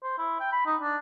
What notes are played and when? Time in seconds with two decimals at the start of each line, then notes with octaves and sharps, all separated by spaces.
0.03 C5
0.18 E4
0.40 G5
0.52 B5
0.66 D#4
0.82 D4